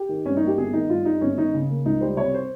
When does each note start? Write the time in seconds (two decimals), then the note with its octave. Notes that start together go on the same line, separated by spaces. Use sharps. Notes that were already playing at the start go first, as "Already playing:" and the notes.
Already playing: G4
0.09 D#3
0.25 G2 C#4
0.37 D#4
0.42 A#3
0.47 G4
0.57 G1 G#4
0.73 D#3 D#4
0.89 G2 F4
1.05 G3 D#4
1.21 G1 C#4
1.37 D#3 D#4
1.54 C#3
1.69 A#3
1.85 C#2 D#4
2.01 G3 C5
2.17 C3 C#5
2.34 C5